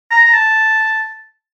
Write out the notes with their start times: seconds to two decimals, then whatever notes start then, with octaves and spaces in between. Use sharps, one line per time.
0.11 A#5
0.25 A#5
0.33 A5